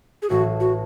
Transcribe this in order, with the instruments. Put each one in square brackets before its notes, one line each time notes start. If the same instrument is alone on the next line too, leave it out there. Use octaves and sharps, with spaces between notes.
[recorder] G#4
[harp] A1 A2 E3 [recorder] F#4
[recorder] F#4